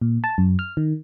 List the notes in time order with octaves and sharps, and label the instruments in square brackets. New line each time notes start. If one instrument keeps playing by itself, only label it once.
[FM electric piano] A#2
A5
F#2
F6
D#3